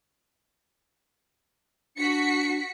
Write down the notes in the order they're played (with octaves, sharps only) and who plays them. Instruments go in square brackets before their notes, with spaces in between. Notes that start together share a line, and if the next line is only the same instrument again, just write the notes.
[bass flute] D4 [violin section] F#4 B6 C#7